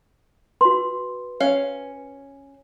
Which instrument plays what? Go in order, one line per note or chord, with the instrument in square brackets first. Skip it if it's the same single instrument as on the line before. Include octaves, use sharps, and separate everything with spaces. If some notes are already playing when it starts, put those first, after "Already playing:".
[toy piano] F#4 C6 [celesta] B4
[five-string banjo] C#4 F5